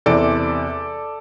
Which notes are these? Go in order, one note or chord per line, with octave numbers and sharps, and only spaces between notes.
E2 C3 E3 A4 D5